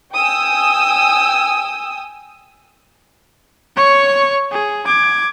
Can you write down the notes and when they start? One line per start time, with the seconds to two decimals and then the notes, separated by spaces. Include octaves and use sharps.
0.14 G5 G#5 D#6 E6
3.77 C#5 C#6
4.52 G#4
4.87 D6 G#6